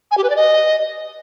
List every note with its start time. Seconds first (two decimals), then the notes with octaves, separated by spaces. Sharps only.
0.11 G#5
0.17 G4
0.24 B4
0.30 D5
0.36 D#5